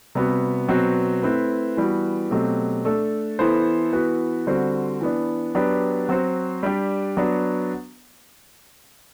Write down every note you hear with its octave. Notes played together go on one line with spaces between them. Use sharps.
C3 G3 B3 F#4
B2 F#3 C4 F#4 B4
A3 C4 E4 B4
E3 G3 B3 F#4
B2 F#3 A3 C4 G4
A3 D4 A4
E3 B3 E4 A4 C5
E3 B3 F#4 B4
D3 G3 C4 F#4 C5
E3 B3 D4
F#3 B3 D4 G4 B4
F#3 C4 F#4 C5
G3 D4 G4
F#3 B3 D4 F#4